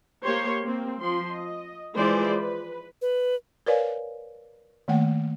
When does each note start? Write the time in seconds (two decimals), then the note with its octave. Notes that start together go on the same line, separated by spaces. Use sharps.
0.23 A#3 G4 C5 C#5 C6
0.64 A#3 C4
1.00 F3 C6
1.31 D#5
1.96 E3 F3 G#3 G#4 C5 D5
2.37 B4
3.02 B4
3.66 A#4 B4 C#5 D5 F5 G#5
4.88 D#3 A3 A#3 F#5 G5